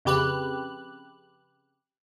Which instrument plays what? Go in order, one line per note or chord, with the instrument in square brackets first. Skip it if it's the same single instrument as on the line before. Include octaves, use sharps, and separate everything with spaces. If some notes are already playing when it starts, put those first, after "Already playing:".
[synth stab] F2 C#3 G4 B4 F#6